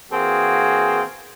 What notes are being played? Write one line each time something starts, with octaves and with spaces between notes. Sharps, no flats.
E3 A#3 C4 F#4 G#4